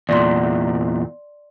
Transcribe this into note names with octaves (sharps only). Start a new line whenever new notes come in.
E2 A#2 D5 C6